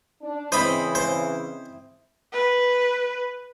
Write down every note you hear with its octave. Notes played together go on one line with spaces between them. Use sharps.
D4
C#3 E3 C4 E4 C5 D#5 B5
C5
B4